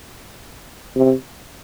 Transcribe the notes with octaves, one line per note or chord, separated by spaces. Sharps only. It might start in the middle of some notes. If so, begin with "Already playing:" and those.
C3